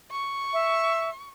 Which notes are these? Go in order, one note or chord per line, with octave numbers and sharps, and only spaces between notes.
C#6
E5